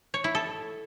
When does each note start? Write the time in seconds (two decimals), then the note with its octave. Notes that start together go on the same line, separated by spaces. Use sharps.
0.14 C#5
0.24 E4
0.35 A4